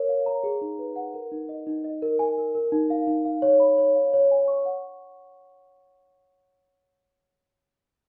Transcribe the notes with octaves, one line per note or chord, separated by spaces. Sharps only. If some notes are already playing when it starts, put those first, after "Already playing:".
Already playing: A#4 C#5
F5
A#5
G#4
D#4
B4
F#5
A#4
D#4
D#5
D#4
D#5
A#4
G#5
A#4
A#4
D#4
F5
D#4
F5
C#5
B5
C#5
F5
C#5
G#5
C#6
F#5